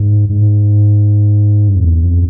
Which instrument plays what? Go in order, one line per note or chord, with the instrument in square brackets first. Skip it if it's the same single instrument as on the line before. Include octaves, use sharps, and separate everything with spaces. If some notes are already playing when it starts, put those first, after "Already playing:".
Already playing: [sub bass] G#2
G#2
G2
F2
E2
F2